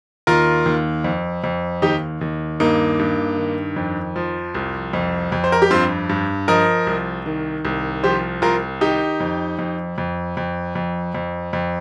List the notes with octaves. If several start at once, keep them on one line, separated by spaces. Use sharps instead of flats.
D#2 F4 A#4
D#2
F2
F2
D#2 D#4 G4
D#2
G2 A#3 D#4
G2
D#3
F2
F3
C2
F2
F2
C5
A#4
G4
G2 C4 F4
G2
F3 A#4 D#5
C2
D#3
C2
F3 G4 C5
C2 F4 A#4
D#3 D#4 G4
F2
F2
F2
F2
F2
F2
F2